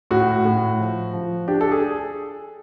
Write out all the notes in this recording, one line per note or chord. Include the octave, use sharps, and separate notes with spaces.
A2 F#4
A2
F3
F3
D4 G4
A4
G#4